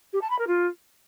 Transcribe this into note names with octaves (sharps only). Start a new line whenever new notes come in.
G4
A5
B5
A#4
F4